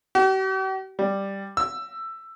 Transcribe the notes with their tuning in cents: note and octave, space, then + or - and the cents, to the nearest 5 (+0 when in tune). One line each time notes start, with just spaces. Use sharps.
G4 -45
G3 +5
E6 +15